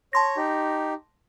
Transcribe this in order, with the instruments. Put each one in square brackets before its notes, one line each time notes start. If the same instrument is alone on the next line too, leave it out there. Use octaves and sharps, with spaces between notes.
[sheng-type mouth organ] C#5 [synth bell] A5 C6 A#6
[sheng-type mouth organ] D#4 G4